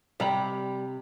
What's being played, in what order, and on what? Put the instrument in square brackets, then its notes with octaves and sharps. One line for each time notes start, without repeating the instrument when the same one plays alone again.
[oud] C3 [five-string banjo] G3 A#5 B5